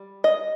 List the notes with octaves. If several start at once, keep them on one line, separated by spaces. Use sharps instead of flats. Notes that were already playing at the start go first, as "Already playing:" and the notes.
Already playing: G3
D#5